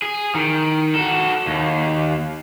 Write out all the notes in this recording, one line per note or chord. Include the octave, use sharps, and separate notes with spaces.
G#4
D#3
F#4 A4
D#2